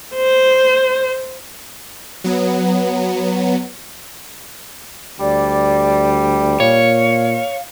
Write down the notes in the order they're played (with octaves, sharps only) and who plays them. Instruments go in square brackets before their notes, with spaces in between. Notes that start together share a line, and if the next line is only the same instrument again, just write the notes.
[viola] C5
[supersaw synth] F#3 B3
[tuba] D2 [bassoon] G3 [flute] D5
[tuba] A#2 [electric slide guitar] C#5 [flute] F5